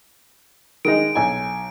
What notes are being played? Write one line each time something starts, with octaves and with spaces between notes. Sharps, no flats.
D#3 G#3 D#4 D7
B1 G#5